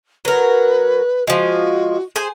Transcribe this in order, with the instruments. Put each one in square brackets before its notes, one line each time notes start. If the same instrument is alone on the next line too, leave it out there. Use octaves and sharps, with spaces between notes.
[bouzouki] F#3 A#4 [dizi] B4
[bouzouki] F3 G#3 [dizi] F#4
[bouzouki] G#4 C5 G#5